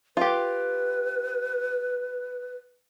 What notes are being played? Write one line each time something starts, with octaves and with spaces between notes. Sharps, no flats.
F4 G4 B4